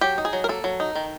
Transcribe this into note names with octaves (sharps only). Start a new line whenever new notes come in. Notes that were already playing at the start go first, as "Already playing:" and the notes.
F#3 G4
D#4
G#4
F#3
A#4
A#3 A4
F#3
D#4
D#3